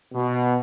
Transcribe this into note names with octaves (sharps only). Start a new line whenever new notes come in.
B2